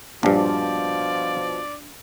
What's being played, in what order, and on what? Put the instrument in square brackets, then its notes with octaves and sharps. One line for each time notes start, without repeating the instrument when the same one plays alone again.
[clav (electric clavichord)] A#1 G2 [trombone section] B2 F3 [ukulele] D4 [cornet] D5